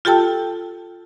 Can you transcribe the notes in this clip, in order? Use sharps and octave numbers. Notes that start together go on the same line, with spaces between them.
F4 G4 A4 G5 A5 E6